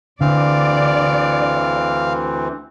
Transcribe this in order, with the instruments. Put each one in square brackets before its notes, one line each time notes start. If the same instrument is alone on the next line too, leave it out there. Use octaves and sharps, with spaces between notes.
[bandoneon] D2 E3 C4 [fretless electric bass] D3 [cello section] D5 [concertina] F5